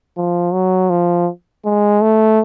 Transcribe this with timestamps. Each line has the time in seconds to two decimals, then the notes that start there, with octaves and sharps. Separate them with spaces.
0.17 F3
0.53 F#3
0.90 F3
1.65 G#3
2.02 A3